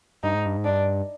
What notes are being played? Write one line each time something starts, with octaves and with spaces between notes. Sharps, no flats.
G2 D#4
G#2
G2
G#2
G2 D4